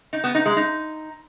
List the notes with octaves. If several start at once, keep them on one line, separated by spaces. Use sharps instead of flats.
D#4
B3
D#4
G#3
D#4